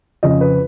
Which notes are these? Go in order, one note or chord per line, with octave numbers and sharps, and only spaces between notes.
F2 C#3 F3 D#5
B4